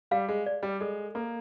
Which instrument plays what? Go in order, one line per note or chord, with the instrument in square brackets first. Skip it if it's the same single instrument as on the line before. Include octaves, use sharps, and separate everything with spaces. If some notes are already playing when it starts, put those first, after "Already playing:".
[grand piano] G3 [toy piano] F5
[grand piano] G#3
[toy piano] D5
[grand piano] G3
[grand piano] G#3 [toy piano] A4
[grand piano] A#3 [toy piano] A4